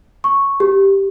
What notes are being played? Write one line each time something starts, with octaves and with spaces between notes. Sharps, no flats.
C#6
G4